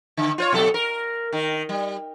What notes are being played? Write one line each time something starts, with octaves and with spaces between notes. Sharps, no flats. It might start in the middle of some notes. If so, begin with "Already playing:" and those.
D3
F4 C5 C#5
B2 F#3 A4
A#4
D#3
G3